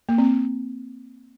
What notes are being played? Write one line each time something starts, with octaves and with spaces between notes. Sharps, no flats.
A#3
C4